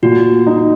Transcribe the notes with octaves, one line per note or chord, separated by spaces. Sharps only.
A#2 F#4
D#4